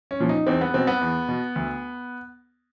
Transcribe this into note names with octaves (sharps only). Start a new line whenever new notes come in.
C#4
A#2 F3
D#4
E2 C4
B3
B2 C4
B3
E2
B2
D2